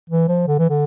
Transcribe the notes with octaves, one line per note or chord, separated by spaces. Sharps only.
E3
F3
D3
E3
D3